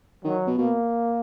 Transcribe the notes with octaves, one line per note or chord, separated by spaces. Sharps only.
D#3 F#3
B2
B2 A#3